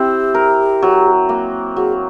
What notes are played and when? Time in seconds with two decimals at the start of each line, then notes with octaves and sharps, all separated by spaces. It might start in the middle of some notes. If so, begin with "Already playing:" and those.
Already playing: C4 E4 G4
0.34 A#4
0.82 F#3
1.29 A#3
1.76 F#3 G#4